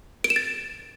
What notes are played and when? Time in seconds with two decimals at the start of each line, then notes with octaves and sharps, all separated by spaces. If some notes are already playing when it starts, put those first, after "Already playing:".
0.24 D7
0.30 E7
0.36 A6